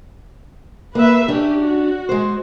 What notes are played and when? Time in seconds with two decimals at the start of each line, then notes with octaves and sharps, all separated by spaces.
0.95 A#3 B4 E5
1.28 C#4 D4 G4
1.62 F#4
2.09 G#3 C5